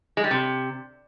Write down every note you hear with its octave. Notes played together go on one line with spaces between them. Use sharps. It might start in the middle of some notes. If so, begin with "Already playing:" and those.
G#3
G3
C3